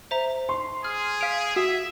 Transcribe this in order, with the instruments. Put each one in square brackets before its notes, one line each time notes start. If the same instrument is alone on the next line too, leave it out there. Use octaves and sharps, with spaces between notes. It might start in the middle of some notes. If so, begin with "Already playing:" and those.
[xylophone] C5 E5 A#5
[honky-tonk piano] C6
[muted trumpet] G#4 [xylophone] F6
[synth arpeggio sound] F5 D7 [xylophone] B6 F7
[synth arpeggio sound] F#4 [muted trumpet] E5 [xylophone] D#6